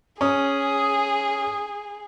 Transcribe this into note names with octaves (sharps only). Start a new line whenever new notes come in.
C#4 G#4 D#6